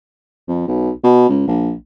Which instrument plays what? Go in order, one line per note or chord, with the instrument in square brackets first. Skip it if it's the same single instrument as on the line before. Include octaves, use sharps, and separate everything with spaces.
[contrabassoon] F2
B1
B2
C#2
A#1